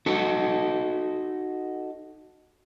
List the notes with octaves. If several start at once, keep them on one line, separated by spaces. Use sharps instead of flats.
D#4 F#4 A4